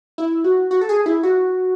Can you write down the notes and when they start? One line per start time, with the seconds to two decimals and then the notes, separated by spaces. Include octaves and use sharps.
0.18 E4
0.44 F#4
0.71 F#4
0.81 A4
0.89 G#4
1.06 E4
1.23 F#4